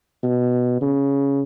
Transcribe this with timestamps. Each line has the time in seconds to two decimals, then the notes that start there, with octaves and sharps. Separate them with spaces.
0.23 B2
0.82 C#3